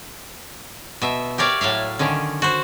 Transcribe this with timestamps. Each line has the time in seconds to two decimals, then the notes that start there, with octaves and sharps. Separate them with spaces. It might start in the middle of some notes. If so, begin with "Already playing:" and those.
1.02 B2 E5
1.38 G4 A#4 C#5 D5 E5 F5
1.61 A2 F#3 E5 F5
1.99 D3 D#3 C#4
2.42 F#4 C5